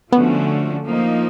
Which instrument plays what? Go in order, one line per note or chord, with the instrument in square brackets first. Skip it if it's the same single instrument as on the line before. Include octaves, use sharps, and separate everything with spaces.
[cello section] D3 F3 A3 C#4 F#4 [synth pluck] B3
[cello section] F3 A#3 D#4